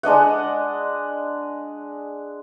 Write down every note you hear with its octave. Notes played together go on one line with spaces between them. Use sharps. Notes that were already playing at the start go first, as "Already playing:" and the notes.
G#3 D4 D#5 F#5